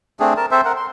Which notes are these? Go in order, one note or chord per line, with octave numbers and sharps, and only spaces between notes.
A3 C4 D4 G#4
A#4 A5
C4 A4 C5 E5
A#4 F#5
C6